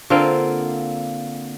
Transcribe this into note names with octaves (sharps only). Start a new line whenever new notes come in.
D3 A#3 C4 F4